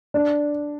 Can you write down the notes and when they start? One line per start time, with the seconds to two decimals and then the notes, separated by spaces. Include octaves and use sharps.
0.14 D4